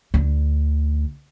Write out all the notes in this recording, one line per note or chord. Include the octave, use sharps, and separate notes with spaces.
D2 D3